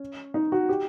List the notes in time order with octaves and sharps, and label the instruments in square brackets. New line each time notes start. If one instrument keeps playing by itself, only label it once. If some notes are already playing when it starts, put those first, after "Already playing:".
Already playing: [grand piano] C#4
D#4
F#4
G4